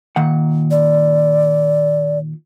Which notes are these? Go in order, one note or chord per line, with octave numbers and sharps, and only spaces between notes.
A#2 D#3 F#5
D5